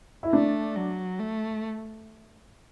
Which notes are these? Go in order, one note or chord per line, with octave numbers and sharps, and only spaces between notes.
E4
A3 D4
F#3
A3